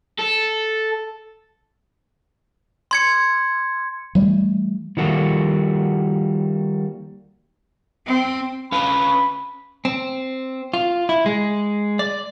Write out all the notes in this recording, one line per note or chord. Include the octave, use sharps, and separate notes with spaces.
A4
C6 G#6 C#7
E3 G3 A3
D#3 F3 G3 A#3 F#4 A4
C4
C#4 B4 F5 B5
C4
F4
E4
G#3
D5